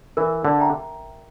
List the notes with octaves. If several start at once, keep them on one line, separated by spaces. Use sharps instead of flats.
E3 A#4
D3
E5 G5 A#5